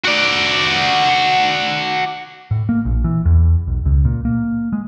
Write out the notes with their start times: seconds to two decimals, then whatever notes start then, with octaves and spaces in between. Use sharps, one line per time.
0.05 F#4 D5
2.51 A2
2.69 A#3
2.85 A#1
3.04 E3
3.25 E2
3.67 B1
3.85 C#2
4.05 A#2
4.25 A#3
4.73 G#3